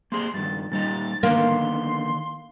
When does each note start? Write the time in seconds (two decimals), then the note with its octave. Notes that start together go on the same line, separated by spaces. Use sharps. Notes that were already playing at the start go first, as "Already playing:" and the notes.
0.12 A#3 C4 G#4 C6
0.34 G2 D#3 A6
0.72 A#2 G3 D#4 A6
1.23 D3 D#3 A#3 B3 C6